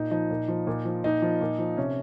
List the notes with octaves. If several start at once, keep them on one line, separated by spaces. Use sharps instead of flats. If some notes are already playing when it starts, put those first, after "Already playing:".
Already playing: A#2 D#4
F3 D#4
A#2
F3
A#2
F3
A#2 D#4
F3
A#2
F3
C3 C#4